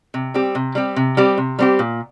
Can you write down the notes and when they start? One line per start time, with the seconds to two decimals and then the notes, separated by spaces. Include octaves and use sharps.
0.14 C3
0.34 G3 C4 G4
0.55 C3
0.75 G3 C4 G4
0.96 C3
1.17 G3 C4 G4
1.38 C3
1.59 G3 C4 G4
1.79 A#2